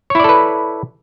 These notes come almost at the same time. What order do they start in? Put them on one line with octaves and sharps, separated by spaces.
C#5 E4 D5 A4 B4